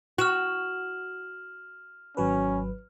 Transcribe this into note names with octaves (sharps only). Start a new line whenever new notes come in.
F#4 F6 E7 F#7
G#1 F#3 C#4 B4